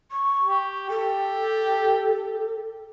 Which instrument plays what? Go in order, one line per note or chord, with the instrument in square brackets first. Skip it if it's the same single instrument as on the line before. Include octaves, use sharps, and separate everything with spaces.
[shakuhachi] C#6
[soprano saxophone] G4
[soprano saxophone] G4 [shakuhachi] A4